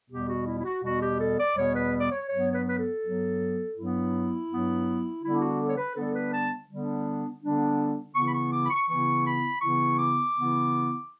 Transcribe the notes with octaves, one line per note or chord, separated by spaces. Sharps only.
E2 B2 G3 B3 G4
F#4
E4
E4
F#4
E2 B2 G3 B3 F#4
G4
A4
D5
E2 B2 G3 B3 C#5
B4
D5
C#5
G2 F#3 B3 C#5
C#5
B4
B4
A4
G2 F#3 B3
G2 F#3 B3 E4
G2 F#3 B3
D3 G3 B3 D4 E4
F#4
A4
C#5
B4
D3 G3 B3 D4 A4
B4
A5
D3 G3 B3 D4
D3 G3 B3 D4
C#3 E3 B3 E4 C#6
B5
C#6
D6
B5
C#6
C#3 E3 B3 E4 C#6
B5
C#3 E3 B3 E4 C#6
D6
C#3 E3 B3 E4